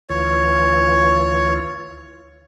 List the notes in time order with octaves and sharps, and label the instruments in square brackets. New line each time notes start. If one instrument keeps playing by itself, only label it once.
[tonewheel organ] D2 E3 F4 [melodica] C#5